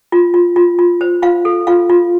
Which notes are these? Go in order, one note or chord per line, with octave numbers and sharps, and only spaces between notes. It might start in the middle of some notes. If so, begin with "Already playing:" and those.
F4
F4
F4
F4
C5
F4 F5
A4
F4 F5
F4